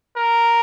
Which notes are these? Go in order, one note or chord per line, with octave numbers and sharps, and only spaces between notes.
A#4